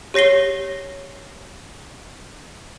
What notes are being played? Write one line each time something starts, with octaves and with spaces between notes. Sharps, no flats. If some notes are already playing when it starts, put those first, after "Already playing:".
G4 C#5 A#6 C7 G7